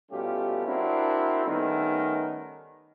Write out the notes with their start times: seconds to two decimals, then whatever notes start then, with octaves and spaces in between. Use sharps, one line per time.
0.11 B2 G3 A3 C#4 F4 G4
0.66 C4 D4 E4 F#4 A#4
1.45 D#3 G3 A3 B3 C#4 D#4